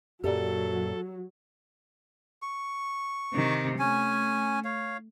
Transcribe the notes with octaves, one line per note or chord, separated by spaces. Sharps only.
F#2 A#2 F#3 G4 A4 D5
C#6
C3 D#3
A3 C#4 G#5
C#5 F5